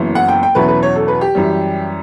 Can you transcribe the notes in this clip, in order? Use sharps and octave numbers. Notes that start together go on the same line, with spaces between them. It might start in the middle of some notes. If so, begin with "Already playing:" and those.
Already playing: F#1 F#2 E3 B3 E4
F#5
G5
G5
E2 B2 F#3 C#4 E4 B4
B4
C#5
A4
B4
G4
F#2 E3 G3